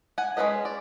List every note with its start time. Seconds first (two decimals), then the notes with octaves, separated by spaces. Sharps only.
0.18 F#5 G#5
0.37 G#3 A#3 C#4 B4 D#5
0.65 D5